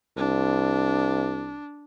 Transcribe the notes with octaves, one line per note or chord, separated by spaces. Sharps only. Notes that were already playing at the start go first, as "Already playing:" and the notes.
C2 D4